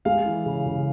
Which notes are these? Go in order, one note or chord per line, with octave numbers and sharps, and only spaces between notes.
G#3 F5
E3
C#3
C#3